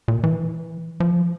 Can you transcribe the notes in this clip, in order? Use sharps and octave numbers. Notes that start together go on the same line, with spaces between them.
A#2
E3
F3